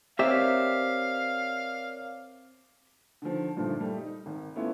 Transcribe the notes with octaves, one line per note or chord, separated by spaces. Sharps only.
C4 G4 A#4 C#5 D5 E5 F5
D3 D#3 F3
G2 A#2 D3 D#3 F3 A3
G3 A3
D#4
G#1
A3 B3 C#4 E4 F4